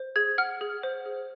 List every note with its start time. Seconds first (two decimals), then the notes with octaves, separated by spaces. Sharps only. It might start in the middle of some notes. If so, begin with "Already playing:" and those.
Already playing: C5
0.16 G#4 G#6
0.38 F#5 F6
0.61 G#4
0.83 C5
1.06 G#4